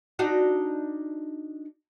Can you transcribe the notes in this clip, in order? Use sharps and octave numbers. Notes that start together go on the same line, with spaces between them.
D4 D#4 F#4